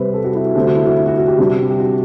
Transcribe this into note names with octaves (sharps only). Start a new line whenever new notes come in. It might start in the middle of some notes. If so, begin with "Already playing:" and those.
Already playing: C3 G3 C4 B4
A4
F#4
E4
D3 A3 C4 G4
F#4
E4
F#4
E4
F#4
F#4
G4
C3 G3 D4
G4
F#4